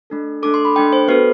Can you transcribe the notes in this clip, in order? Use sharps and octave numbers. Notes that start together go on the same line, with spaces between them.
A3 D4 A4
A3 D4 A4 D6
C6
B5
A3 D4 A4 G5
C5
B3 F#4 A4 B4